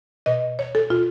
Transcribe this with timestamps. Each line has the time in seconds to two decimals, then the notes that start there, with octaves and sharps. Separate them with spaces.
0.26 B2 D#5
0.59 C#5
0.75 A4
0.90 B2 F4